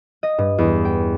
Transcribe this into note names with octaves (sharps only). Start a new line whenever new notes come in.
D#5
G2
E2
G5